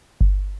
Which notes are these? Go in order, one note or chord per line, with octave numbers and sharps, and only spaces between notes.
G1